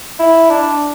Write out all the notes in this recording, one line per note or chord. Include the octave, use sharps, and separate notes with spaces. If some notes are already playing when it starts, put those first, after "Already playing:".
E4
D4